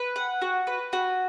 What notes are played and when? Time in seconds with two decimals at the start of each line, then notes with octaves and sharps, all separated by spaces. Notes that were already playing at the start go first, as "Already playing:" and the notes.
Already playing: B4
0.16 F#5
0.42 F#4
0.67 B4
0.93 F#4